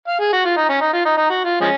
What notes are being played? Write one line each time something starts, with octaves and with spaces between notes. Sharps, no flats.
F5
G#4
F#4
F4
D#4
C#4
D#4
F4
D#4
D#4
F#4
F4
F3 G#3 C#4